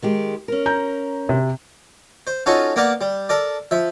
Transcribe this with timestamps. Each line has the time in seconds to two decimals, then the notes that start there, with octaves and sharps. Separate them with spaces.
0.02 D#3 G#3 G4
0.48 C#4 A#4
0.66 A#5 G6
1.29 C3
2.27 C5
2.46 C#4 D#4 F4 F#4 A4 C#6
2.76 A#3 B3 A#4 D5 F5 F#5
3.01 G3
3.29 A4 A#4 D5
3.71 F3 E5